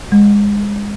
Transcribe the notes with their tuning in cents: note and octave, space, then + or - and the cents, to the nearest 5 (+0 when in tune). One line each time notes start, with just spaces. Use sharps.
G#3 -20